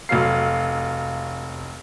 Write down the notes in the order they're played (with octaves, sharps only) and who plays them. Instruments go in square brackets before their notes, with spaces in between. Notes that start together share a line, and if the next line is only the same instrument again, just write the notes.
[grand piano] F1 F#3 C7 [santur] F5 G#5